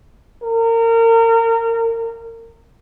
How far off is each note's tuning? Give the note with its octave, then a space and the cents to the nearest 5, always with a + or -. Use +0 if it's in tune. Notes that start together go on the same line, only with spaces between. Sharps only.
A#4 -30